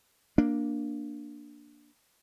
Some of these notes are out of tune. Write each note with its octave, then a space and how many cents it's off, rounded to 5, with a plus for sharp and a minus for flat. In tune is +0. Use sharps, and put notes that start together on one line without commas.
A#3 +0 D4 +0